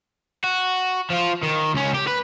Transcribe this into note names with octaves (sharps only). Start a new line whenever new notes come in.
F#4
F3 F4
D#3
C#2 C#4
G4
B4